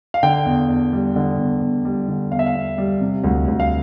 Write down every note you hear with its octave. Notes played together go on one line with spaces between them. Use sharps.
F5
D3 G5
E2
E2
G3
D3
E2
E2
G3
D3
E2 F5
E5
F5
E2
G3
C3
D2
D2
F5